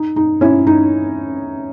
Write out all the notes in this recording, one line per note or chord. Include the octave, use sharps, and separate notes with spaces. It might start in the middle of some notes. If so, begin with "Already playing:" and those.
Already playing: D#4
D#4
C#4 E4
D#4